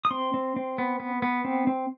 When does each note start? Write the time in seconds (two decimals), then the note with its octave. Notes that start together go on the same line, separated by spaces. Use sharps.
0.05 D#6
0.11 C4 C6
0.34 C4
0.56 C4
0.78 B3
1.00 B3
1.22 B3
1.45 C4
1.67 C4